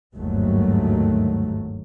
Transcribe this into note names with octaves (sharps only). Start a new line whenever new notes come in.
G1 D#2 G#2 D#3 F#3 A3